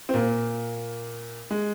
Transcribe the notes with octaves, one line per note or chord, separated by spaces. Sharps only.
C4
A#2 A#3
G#3